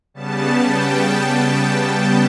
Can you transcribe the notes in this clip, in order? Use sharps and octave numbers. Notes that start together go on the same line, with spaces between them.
C#3 G3 B3 A5
G5